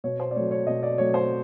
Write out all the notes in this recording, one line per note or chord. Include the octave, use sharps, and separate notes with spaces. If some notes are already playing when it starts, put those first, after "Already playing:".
B2 C#5
C5
D5
F#3 A3 C#5
C#5
B2 D#5
D5
F#3 A3 C#5
C5